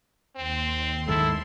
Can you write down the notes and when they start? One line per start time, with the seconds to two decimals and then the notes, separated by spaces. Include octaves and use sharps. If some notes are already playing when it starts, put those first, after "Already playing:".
0.36 D#2 C4 C6
1.08 G#2 D#3 G#3 E4 A4